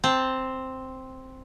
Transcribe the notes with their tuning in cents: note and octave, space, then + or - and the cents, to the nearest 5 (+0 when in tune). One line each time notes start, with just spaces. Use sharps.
C4 +0 A5 +10